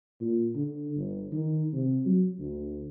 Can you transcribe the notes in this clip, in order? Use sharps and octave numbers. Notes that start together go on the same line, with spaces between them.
A#2
D3
G1
D#3
C3
F#3
D2